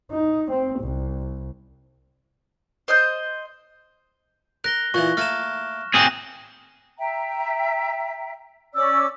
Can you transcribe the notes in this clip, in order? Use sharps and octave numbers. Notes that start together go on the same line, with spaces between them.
D#4
C4
C2
C5 D#5 G6
A#4 F#6 A#6 G7
A#2 E3 C#6 F#6
A3 A#3 F6 E7
C4 G#4 F#6 A#6
E5 G5 A#5
C#4 D5 D6 E6